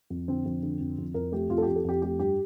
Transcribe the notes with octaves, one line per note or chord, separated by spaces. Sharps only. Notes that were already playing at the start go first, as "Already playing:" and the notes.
F2
D3 C4
F2
D3
F2
F2
F2 A#4
A3 G4
F2 F4
A4
F2 G4
A4
F2 G4
A3 G4
G2 G4